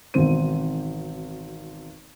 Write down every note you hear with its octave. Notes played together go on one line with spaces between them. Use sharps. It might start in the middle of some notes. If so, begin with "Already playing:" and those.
G#1 B2 D#3 E3 C4 D#7